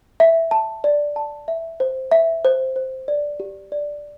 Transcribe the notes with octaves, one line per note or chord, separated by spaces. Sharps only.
E5
A5
D5
A5
E5
C5
E5
C5
C5
D5
G4
D5